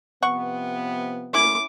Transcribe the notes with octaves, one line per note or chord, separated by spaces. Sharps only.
C3 F3 B3 F#5 C#6
C#4 E4 D6